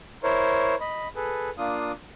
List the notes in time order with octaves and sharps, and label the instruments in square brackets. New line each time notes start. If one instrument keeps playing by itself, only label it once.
[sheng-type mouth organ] E4 A#4 C5 C#5
D#5 B5
G#4 A4 B4
A#3 D4 F4 D#6